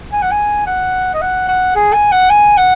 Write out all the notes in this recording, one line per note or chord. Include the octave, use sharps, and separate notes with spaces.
G#5
F#5
G#5
F#5
D#5
F#5
F#5
G#4
G#5
F#5
G#5
F#5